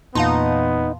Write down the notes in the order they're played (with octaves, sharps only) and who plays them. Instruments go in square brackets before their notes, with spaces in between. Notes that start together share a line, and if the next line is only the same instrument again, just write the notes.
[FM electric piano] E2 A#2 [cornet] B3 [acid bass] D#4 [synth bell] F5 A5 C6